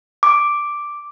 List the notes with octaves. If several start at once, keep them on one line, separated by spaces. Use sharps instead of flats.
D6